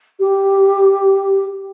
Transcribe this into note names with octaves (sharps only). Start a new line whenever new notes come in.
G4